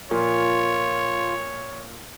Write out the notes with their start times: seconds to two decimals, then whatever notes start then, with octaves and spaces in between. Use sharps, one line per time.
0.11 A#2 F3 A#3 F4 C#5